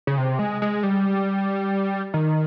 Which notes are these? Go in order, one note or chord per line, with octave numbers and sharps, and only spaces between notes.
C#3
C3
G#3
G#3
G3
D#3